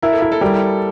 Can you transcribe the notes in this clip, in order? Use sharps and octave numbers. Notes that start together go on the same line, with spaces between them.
E4 A#4
A4
E4 A#4
A4
G3 A#4